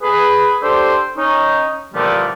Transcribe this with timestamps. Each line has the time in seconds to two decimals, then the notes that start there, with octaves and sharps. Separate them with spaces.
0.02 G#4 B4
0.62 D4 G4 A4 C5
1.17 C#4 D#4
1.94 A#2 D3 E3 F3 G3 A3